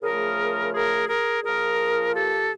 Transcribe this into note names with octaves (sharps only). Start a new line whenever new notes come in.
C#3 F3 A3 G#4 A#4
G#4 A#4
G#4 A#4
A#2 F3 A#3 G#4 A#4
G4 A4